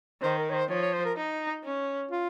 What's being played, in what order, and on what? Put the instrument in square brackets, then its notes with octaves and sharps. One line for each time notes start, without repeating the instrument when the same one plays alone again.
[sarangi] D#3 [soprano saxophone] C5
[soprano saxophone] A#4
C#5
C5
[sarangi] F3 [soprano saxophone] C#5
[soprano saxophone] C#5
C5
A#4
[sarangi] D#4
C#4
[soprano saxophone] F4